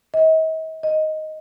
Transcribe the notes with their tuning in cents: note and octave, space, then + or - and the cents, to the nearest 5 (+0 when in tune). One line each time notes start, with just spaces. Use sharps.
D#5 +45
D#5 +5